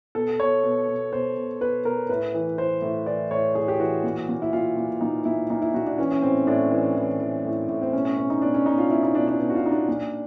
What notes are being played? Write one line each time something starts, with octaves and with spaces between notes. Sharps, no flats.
B2 A4
B2 C#5
B2
B2
B2 C5
B2
B2 B4
B2 A#4
A2 B4
E3
E3 C5
A2
E3 D5
A2 C#5
A2 G#4
G4
E3 F#4
A#2
A#2
E4
A#2 F4
A#2
A#2 D#4
A#2 E4
A#2 D#4
E4
A#2 F#4
D4
E3 C#4
C#4
A2 C4
A2 D4
E3
E3
E3
A2
A2
C4
B2 C#4
C#4
B2 C#4
D#4
B2 D4
C#4
B2 D#4
F4
B2 E4
D#4
B2 D4
D4
B2
F#4
F4
B2 D#4
D4
A#2